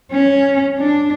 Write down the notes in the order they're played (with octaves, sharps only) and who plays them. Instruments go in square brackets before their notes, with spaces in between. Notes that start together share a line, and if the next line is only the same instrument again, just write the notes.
[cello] C#4
D4